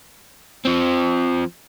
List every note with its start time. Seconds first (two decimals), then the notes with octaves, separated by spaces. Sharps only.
0.65 F3 C4